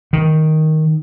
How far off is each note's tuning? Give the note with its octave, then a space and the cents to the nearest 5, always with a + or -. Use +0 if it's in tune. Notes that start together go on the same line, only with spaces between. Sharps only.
D#3 +5